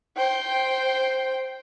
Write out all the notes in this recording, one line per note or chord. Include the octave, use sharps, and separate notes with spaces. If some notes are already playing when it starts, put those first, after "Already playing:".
C5 G5